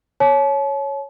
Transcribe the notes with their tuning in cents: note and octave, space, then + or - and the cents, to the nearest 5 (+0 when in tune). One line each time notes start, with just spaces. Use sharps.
C#5 +0 A5 -40